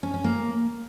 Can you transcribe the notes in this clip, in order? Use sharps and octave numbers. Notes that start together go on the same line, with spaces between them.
C#4
C#4
A#3